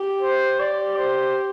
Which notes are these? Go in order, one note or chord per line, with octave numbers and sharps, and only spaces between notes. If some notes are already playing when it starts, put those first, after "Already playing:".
Already playing: G4
C5
G4 D5
C5